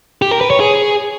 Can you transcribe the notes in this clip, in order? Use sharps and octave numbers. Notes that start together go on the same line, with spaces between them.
G4
A#4
B4
C#5
G#4